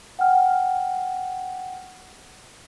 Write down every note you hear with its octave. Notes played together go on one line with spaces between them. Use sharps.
F#5 G5 F6